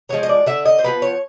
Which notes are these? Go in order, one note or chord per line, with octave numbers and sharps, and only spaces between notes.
F3 G#3 B3 C#5
D#5
D5
D3 E5
D#5
C5
F3 G#3 B3 B4
C#5